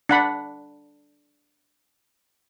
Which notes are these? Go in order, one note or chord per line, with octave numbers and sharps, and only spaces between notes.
D4 F#5 B5